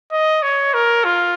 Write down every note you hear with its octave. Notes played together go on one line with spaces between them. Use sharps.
D#5
C#5
A#4
F4